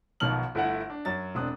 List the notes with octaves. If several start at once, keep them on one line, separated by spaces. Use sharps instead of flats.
B1 B2 D#3 F3 F6 F#7
G1 A3 E4 A4 F#5
D4
F#2 F#3 A6
E1 C4 D4 D#6 F#6